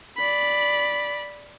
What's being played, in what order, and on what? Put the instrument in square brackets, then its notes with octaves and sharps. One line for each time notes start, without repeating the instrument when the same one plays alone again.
[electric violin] D5 B5